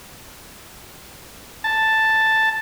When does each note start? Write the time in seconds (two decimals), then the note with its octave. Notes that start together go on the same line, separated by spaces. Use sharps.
1.64 A5